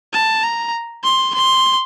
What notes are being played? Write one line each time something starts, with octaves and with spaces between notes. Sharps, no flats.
A5
A#5
C6
C6